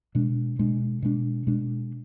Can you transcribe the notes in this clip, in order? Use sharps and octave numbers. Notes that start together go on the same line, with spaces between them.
B2 G#3 D4
B2 G#3 D4
B2 G#3 D4
B2 G#3 D4